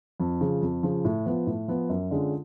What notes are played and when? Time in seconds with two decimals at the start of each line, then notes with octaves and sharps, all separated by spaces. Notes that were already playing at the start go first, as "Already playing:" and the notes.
0.20 F2
0.41 C#3 F3
0.62 F2
0.83 C#3 F3
1.05 A2
1.26 F3 B3
1.47 A2
1.68 F3 B3
1.89 F#2
2.11 D3 G#3 C#4 F4